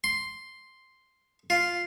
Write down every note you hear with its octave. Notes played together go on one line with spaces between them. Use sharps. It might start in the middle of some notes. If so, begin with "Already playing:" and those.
C6
F4